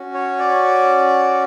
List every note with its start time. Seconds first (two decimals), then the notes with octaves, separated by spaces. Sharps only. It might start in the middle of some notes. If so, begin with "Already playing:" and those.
Already playing: C#4 F#4
0.14 C#5
0.39 D5